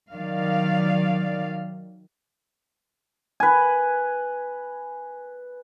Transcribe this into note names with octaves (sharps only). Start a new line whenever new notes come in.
D#3 F#3 D5 F5
B4 G#5